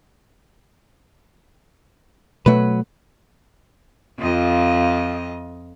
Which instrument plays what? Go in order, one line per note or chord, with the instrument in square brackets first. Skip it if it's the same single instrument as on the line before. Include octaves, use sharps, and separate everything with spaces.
[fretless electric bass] B2 A3 [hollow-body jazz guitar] F#3 B4
[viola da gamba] F2 F4 D#5